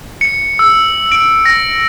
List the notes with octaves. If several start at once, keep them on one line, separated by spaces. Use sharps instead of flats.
C#7
E6
D7
A#6